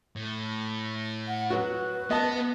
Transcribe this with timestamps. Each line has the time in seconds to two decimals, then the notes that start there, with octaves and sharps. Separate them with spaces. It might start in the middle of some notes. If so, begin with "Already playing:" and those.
0.16 A2
1.28 F#5
1.50 F#3 F#4 B4
2.11 B3 D#5 A5